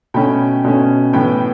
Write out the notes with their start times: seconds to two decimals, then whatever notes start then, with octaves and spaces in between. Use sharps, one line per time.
0.14 B2 A3 C#4 G5 B5
0.65 B2 A3 C#4
1.13 A2 E3 B3 G5 B5